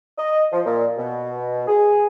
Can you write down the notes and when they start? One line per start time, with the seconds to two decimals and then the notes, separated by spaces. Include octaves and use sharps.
0.18 D#5
0.52 F3
0.65 A#2
0.98 B2
1.67 G#4